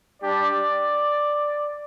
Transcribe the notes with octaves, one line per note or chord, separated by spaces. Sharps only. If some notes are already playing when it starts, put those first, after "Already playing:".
G3 D4 G4 D5